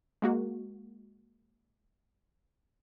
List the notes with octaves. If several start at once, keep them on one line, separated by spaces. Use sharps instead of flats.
G#3 A#3 F#4